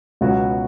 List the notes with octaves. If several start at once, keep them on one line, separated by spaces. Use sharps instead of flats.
C#2 B2 F#3 B3 F#4